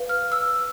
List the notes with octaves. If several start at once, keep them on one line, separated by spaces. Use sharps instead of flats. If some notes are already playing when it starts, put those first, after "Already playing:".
Already playing: B4 F5
F6
E6